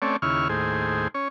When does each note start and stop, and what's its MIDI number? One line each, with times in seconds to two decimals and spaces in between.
0.02 0.17 57
0.02 0.17 60
0.02 0.17 61
0.02 0.17 73
0.02 0.17 74
0.22 0.48 39
0.22 0.48 49
0.22 0.48 64
0.22 0.48 85
0.22 0.48 89
0.49 1.08 39
0.49 1.08 45
0.49 1.08 68
0.49 1.08 72
1.14 1.28 61
1.14 1.28 73